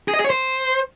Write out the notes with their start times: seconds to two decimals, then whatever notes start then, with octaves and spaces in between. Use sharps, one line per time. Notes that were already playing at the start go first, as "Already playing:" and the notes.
0.08 G#4
0.14 D#5
0.19 G#4
0.25 C#5
0.30 C5